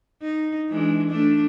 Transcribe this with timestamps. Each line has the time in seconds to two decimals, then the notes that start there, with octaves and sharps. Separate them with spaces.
0.22 D#4
0.69 E3 G#3 D4
1.08 A3 D4